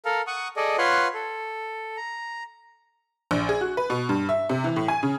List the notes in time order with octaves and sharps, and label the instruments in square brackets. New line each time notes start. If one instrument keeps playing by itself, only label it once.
[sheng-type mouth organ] A4 A#4 F5
F#5 C#6 D#6
G#4 A4 D5 D#5
F4 B4 C#5 F#5 C6
A4
A#5
[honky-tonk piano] A#1
G#4
F#4
B4
B2
G2
E5
C3
E3
A2
G#5
C#3